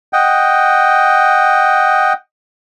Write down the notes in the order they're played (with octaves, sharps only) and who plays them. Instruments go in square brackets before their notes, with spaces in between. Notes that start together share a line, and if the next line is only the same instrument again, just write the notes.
[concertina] D#5 F#5 G5